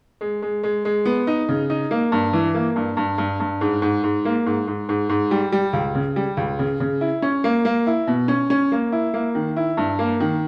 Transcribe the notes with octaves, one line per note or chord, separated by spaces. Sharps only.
G#3
G#3
G#3
G#3
B3
D#4
C#3
D#4
A#3
G2
E3
A#3
G2
G2
G2
G2
G#2
G#2
G#2
A#3
G#2
G#2
G#2
G#2
G3
G3
C#2
C#3
G3
C#2
C#3
C#3
E4
C#4
A#3
A#3
E4
B2
C#4
C#4
A#3
E4
A#3
D#3
E4
G2
A#3
D#3